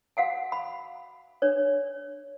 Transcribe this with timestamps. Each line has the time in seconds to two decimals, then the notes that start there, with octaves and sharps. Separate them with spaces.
0.17 F#4 F5 F#5 G#5
0.52 B5
1.42 D4 C#5